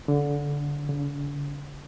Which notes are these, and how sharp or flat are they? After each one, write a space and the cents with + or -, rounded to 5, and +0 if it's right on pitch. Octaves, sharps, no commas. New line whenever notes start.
D3 -20
D3 -45